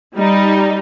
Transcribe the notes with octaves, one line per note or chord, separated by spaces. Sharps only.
G3 D#4